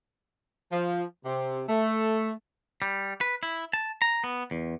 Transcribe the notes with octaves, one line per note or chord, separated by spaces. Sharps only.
F3
C3
A3
G3
B4
E4
A5
A#5
B3
E2